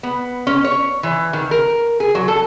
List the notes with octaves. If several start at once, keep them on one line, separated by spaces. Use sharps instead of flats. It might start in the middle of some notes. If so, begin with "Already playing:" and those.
B3
C#4
C#5
E3
D#3
A#4
G#4
F#3
A4